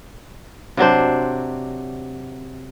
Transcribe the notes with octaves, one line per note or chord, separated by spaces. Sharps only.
C3 F#3 D4 C5